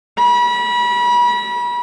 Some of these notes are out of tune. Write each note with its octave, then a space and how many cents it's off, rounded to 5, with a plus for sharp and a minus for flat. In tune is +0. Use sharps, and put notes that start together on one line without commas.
B5 -35